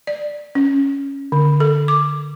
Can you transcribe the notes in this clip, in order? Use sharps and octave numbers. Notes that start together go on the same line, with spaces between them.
D5
C#4
D3
A4
D6